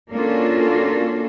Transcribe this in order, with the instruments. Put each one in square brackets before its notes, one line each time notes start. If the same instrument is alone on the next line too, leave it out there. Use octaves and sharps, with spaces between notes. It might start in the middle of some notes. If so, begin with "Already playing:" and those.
[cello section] A#3 C#4 D4 F4 F#4 A4